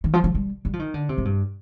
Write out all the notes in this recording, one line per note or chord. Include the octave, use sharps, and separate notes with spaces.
D#3
F3
F3
G3
G3
F3
D#3
D3
C3
G#2
G2